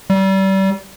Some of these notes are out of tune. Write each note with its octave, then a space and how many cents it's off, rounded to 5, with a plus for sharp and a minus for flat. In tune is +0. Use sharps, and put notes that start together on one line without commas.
G3 -30